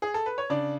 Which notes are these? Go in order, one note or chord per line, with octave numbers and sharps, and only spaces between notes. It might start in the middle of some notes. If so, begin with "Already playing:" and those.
G#4
A4
B4
C#5
C#3 D4 D5